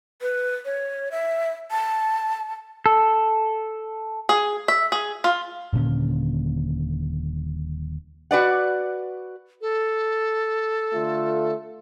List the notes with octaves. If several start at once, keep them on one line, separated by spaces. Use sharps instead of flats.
B4
C#5
E5
A5
A4
G#4
E5
G#4
F4
D#1 A#2 D3 C#4
F#4 B4 D5 F#5
A4
D3 A3 F4